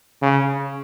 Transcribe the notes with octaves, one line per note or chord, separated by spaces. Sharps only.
C#3